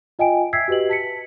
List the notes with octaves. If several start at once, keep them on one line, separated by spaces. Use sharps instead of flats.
F4 D#5 G5 G#5 D7
E5 G5 E6 G#6 B6 C7
F#4 G4 B4 D#5 F#7
A5 B6 C#7